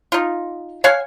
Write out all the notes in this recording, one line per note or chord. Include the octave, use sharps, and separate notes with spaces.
D#4 F4
C#5 F5 F#5 G#5